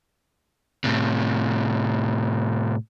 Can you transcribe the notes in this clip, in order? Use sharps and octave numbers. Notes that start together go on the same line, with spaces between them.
A2 C3